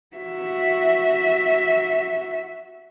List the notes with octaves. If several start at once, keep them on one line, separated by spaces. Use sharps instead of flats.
F#4 E5